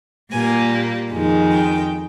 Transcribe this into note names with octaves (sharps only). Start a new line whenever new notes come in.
A#2 G3 A#3 G#5
F2 D#3 G#3
G5